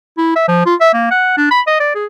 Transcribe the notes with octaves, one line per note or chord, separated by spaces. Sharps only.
E4
E5
F3
F4
E5
A#3
F#5
D4
B5
D#5
D5
G#4